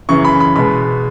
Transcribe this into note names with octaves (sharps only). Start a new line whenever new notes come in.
F#2 C#3 E3 C#6
B5
B5
B2 G#3 B3 B5